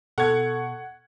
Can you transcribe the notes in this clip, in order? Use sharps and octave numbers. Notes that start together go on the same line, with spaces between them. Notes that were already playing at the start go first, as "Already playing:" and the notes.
B2 A4 F#5 C#6 G#6